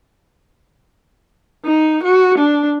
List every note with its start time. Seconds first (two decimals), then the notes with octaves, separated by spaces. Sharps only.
1.66 D#4
2.04 F#4
2.39 D4